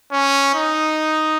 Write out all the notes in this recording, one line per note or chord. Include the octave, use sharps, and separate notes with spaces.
C#4
D#4